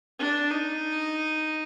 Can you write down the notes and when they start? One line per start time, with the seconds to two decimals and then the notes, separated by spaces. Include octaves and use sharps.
0.19 D4
0.50 D#4